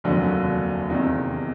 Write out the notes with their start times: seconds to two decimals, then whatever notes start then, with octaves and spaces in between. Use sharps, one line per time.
0.04 F1 D#2 D3 F#3
0.90 E2 C3 D#3